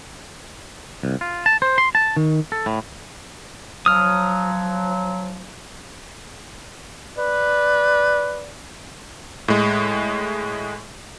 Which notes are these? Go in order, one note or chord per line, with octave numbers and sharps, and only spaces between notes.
C2
F4
A5
C5
C6
A5
D#3
A4
A2
F3 F#3 D#6 F6
B4 D5
A2 G#3